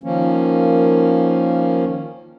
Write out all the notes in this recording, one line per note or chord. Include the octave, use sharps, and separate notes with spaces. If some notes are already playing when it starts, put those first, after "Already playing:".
D#3 F3 A#3 C#4